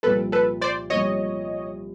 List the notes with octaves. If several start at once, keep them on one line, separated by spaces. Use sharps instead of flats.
C2 A#2 F3 A4 B4
A4 B4
C5 D5
C2 A#2 F3 C#5 D#5